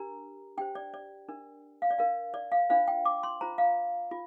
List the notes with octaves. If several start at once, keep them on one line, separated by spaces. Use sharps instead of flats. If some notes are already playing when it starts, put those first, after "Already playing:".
Already playing: D4 G4 A#4 A#5
D4 G4 C5 G5
D5
D5
D4 A#4
F5
D5
D4 A#4 F5
D5
F5
D4 F4 C5 F5
G5
D6
C6
F4 C5 A#5
F5
F4